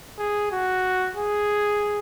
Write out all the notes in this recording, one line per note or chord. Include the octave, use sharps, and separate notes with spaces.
G#4
F#4
G#4